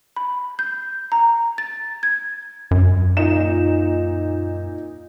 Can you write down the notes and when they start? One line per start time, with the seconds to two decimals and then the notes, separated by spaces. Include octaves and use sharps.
0.17 B5
0.59 G6
1.12 A#5
1.58 A6
2.03 G#6
2.71 F#2
3.17 A#2 D#4 E7